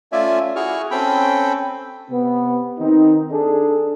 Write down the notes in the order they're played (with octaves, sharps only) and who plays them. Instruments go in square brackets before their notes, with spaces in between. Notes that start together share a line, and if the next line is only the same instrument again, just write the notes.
[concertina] A3 C#4 F4 D5 E5 G#5
E4 F#4 G#4 C#6 F6
C4 C#4 A4 G5 B5
[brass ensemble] C3 B3
D#3 C4 D#4
D4 G#4 A4